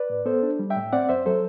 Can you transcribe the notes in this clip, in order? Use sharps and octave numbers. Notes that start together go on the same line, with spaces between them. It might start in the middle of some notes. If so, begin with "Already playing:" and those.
Already playing: B4 D5
A2
B3 A4 C5
D4
G3
E5 G5
A2
C4 D5 F#5
F#2 C5 E5
F#3 A4 C5